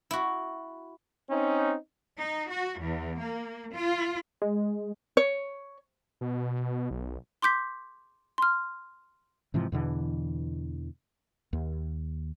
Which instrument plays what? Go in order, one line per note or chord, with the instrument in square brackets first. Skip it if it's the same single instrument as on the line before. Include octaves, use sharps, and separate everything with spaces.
[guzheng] E4 F#4
[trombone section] C4 C#4 D#4
[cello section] D#4
F#4
E2
A#3
F4
[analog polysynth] G#3
[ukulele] C#5
[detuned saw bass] B2
B1
[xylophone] C6 D6 G6 B6
C6 F6
[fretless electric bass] G#2 C3 E3 F3
E2 B2 D3 E3
D#2